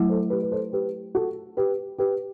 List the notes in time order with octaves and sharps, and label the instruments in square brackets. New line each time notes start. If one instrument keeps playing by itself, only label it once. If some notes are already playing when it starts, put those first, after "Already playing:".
Already playing: [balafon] F#3 A3 E4
[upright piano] A4 C5
G4 B4
B4
A4 C5
G4 B4
F#4 A4
G4 B4
G4 B4